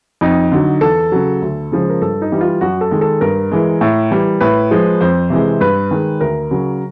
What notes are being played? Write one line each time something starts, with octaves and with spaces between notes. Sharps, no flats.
F2 D#4
D3 F#3
E2 A4
C#3 F#3
D2
C#3 F3 G#3
A#4
G2 A4
D#4
E3 G3
F4
F#2 F#4
A4
D#3 G#3
A4
G2 A#4
E3 G#3
A2
E3 G3
A2 B4
F3 G#3
F2 C5
C3 E3 G#3
G2 B4
D#3 G#3
D2 A#4
C#3 F#3